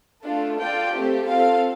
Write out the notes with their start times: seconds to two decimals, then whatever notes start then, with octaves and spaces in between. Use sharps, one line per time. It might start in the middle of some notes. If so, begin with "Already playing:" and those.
0.24 A3 D4 F4 A4
0.59 F4 A4 D5 G5
0.94 A3 C4 G4
1.29 C4 F4 A4 F5